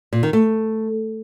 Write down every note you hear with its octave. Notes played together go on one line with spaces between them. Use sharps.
A#2
D#3
A3